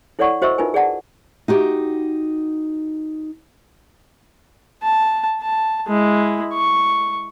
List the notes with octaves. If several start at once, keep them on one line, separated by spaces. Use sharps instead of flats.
E4 A4 C#5 D5 F#5 C#6
F#4 C5 D#5 E5 C#6 E6
D#4 F4 A#4 B4 G#5
G#4 D5 F#5 A5
D#4 F#4 G4
A5
A5
G#3 E4
C#6